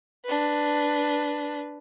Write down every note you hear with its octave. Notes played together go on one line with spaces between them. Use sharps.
D4 B4